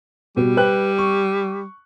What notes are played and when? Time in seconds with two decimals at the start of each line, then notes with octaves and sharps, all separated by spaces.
0.37 B2 G3
0.57 B4 G5 F#6
0.98 C#6